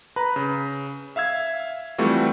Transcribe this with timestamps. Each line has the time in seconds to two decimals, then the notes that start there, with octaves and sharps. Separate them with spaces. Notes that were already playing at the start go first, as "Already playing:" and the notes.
0.16 B4 A#5 B5
0.36 C#3
1.16 E5 F5 E6 G#6
1.98 E3 F3 G3 A3 C4 F#4